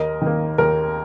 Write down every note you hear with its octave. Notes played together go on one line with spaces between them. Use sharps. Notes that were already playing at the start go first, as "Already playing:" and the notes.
Already playing: D#2 A#4 D#5
D#3 A#3
D#2 A#4